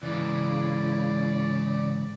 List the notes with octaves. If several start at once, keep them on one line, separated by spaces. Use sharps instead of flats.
G#2 C#3 E3 E4 D5